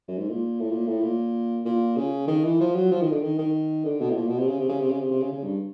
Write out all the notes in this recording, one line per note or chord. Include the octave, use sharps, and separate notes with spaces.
F#2
G#2
A#2
A2
A#2
A2
A#2
A#2
C#3
D#3
E3
F3
F#3
F3
D#3
D3
D#3
D#3
D3
B2
A2
A#2
B2
C3
C#3
C3
C#3
C3
C#3
C3
C3
C#3
C#3
G2